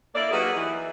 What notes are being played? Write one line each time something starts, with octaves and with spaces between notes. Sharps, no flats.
A#3 E4 A4 D5
F#3 A#3 D#4 G4 G#4 B4
E3